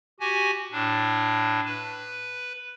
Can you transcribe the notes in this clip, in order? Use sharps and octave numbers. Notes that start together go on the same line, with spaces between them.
F#4 G4 G#5
A2 D4
B4